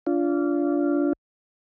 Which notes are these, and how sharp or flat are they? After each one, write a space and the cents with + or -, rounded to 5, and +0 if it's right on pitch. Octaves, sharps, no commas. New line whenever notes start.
D4 -30 F4 -15